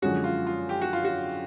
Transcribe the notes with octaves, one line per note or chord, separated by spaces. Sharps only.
F#2 D3 F3 G#3 C#4 F#4
F4
F4
G4
F#4
F4
F#4